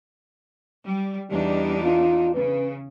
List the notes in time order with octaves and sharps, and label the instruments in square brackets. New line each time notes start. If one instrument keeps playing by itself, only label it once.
[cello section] G3
[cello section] E2 D4 D#4 [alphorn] G3
[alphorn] F4
[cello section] C#3 [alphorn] B4